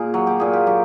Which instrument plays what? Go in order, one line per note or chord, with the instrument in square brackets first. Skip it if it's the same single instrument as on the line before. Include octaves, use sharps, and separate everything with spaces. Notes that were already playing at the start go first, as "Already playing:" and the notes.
Already playing: [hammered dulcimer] A#2 G#4 A#4
F#3
G4
A#2 G#4
G4
F#3 G4